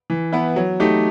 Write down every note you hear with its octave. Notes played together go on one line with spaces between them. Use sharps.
E3
B3 E4 B4
F#3
A3 D#4 G4